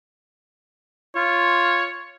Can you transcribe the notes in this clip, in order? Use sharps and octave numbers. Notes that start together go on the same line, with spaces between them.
F4 C#5